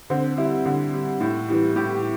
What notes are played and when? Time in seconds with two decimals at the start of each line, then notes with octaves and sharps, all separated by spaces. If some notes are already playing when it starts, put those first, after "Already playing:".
0.10 D3 C4
0.37 G3 E4
0.65 D3
0.93 G3
1.21 A2
1.48 E3 G3
1.76 A2 G4